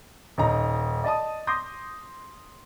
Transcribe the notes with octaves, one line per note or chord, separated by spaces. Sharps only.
D#1 D#4 A#5
D5 D#5 A5 D#6
C6 D6 D#6 G6 A#6